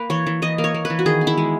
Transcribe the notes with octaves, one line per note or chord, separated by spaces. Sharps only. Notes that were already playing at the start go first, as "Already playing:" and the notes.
Already playing: A#3 B4
E3 C#5
E3
E3 D#5
A#3
C#5
A#3
B4
E3
F#4
D#3 G#4
B3
E4
G#3